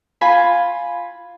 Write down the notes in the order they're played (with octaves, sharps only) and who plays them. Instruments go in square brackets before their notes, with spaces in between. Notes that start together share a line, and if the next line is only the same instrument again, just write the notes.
[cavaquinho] F4 G#5 B5